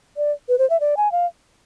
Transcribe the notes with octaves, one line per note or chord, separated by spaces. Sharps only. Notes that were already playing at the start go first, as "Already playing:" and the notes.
D5
B4
C5
E5
D5
G#5
F5